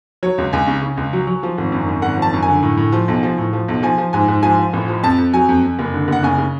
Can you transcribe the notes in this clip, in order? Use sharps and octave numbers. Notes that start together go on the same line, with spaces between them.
F#3 C#5
C#2
C#2 G#5
C#3
C#3
C#2
F#3
F#3
F3
G#1
F#2
F#2
G#1 F#5
F3
A5
F#2
G#5
D3
A2
A2
F3
B1
F3
A2
F3
B1
F3 G#5
F3
G#2 G#5
G#2
F3 G#5
F3
A1
F3
F2 A5
F2
F#3 G#5
F2
F2
F#1
D3
F#1 F#5
C#3 G#5
C#3